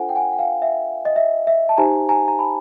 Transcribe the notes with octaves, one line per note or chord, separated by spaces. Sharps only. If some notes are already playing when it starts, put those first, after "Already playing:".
Already playing: D4 F4 A4 C5 F#5 G#5
G5
F#5 G#5
F#5
F5 G5
E5
D#5
E5
E5
A5
D#4 G4 C5 G#5 A#5
G#5 A#5
A#5
A5 B5